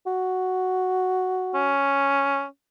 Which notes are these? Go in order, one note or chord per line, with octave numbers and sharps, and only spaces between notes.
F#4
C#4